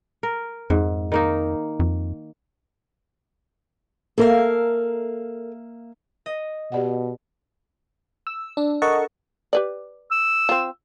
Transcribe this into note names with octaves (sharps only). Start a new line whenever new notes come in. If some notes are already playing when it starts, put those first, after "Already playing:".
A#4
F2 G#2
D#3 A#3 D#4
F2
A#3 A4 A#4 E5 F5
D#5
B2 G4 D5 F#5
E6
D4
A4 A#4 D#5 F#5 A5 C#6
G4 B4 D5
E6
C4 F4